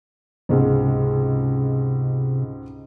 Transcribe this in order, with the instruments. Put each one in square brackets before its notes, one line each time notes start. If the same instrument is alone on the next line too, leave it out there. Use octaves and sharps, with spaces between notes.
[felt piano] C#2 G#2 [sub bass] C3